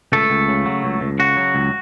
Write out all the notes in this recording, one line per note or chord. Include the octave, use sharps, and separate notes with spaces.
C#2 A3 A4
C#2
C#3
F#3
C#2
C#2
C#3 F#4
F#3
C#2